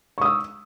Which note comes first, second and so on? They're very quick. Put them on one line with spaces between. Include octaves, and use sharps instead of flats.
C#6 D#6 E6